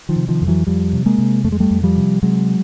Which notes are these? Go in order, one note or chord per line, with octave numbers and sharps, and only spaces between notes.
D#3 F3
C3
D#3 F3
F2
E3 F#3
F2 F3 G3
C3
G#3 A#3
C3
F2 A3
G#3
G3 A3
F2
F3 G3
C3
C3 F#3 G#3